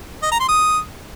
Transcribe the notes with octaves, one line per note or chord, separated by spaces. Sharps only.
D#5
A#5
C6
D#6